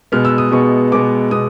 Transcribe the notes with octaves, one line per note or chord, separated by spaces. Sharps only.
B2 G#3 B3 F6
E6
D#6
B2 G#3 B3 C#6
B2 G#3 B3 D6
B2 D#6